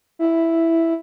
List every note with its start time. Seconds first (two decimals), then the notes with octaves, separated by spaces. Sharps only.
0.19 E4